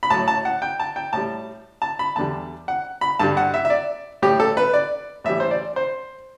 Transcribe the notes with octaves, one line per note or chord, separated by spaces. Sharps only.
B5
A2 F#3 A5
A5
F#5
G5
A5
G5
A2 G3 A5
A5
B5
E2 D3 G3 A5
F#5
B5
G2 D3 G3 A5
F#5
E5
E5
D5
A2 G3 G4
A4
B4
D5
A2 E3 G3 E5
C5
D5
C5